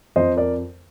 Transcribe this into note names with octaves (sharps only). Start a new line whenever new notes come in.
F2 C5 D#5
A#4 D5